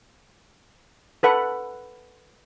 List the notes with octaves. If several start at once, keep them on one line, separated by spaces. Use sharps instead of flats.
A4 B4 F#5